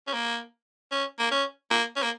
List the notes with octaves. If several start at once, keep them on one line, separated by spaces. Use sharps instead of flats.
C#4
A#3
C#4
A#3
C#4
A#3
C#4
A#3